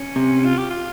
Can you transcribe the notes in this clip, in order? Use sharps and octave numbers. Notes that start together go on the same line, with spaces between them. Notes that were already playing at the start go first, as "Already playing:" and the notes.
Already playing: C#4
C3
F4
G4
F4